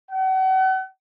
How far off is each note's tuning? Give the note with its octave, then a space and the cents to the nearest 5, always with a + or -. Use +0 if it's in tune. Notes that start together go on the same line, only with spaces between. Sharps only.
F#5 +40